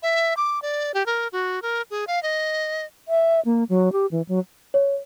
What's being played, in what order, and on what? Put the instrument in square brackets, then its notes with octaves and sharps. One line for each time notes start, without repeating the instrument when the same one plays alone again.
[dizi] E5
D6
D5
G4
A#4
F#4
A#4
G#4
F5
D#5
[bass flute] E5
A#3
F#3
G4
E3
F#3
[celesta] C#5